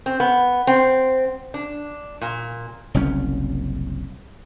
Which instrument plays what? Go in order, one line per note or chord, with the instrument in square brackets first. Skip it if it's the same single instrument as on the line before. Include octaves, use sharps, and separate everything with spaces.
[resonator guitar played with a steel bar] C4
B3
C4
D4
A#2
[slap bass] F#1 C2 F#2 C#4